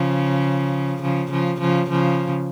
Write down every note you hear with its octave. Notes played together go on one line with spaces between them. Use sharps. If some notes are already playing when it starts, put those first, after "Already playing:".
Already playing: C#3 F3
C#3 F3
C#3 F3
C#3 F3
C#3 F3